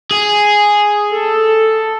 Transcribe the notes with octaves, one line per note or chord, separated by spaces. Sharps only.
G#4
A4